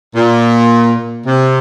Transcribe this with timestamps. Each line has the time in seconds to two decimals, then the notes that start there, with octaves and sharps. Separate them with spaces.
0.15 A#2
1.26 C3